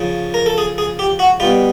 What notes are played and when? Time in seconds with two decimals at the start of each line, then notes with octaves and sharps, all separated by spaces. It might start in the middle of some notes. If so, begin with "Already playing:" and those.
Already playing: C#3 F3
0.34 A#4
0.46 A4
0.58 G#4
0.78 G#4
0.99 G4
1.19 F#4
1.40 G3 F4
1.43 B2